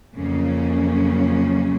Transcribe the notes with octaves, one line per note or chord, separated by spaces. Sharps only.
F2 C#3 F#3 A#3 C#4